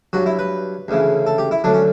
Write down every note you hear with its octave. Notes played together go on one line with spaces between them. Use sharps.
G2 F#3 F#4
E4
B4
D2 C#3 E3
A4
G4
E4
D2 D3 F#3 D4
C#4